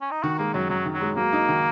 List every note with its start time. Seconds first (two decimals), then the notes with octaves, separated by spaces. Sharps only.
0.01 C#4
0.11 D#4
0.23 D#3 F#4
0.38 G#3 A#3
0.54 F#2 F#3
0.70 F#2 F#3
0.86 D#3
0.93 F#3
1.01 G#3
1.16 F#3 A#3
1.33 D#4
1.49 D#3